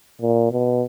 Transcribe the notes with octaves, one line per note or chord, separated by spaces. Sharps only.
A#2
B2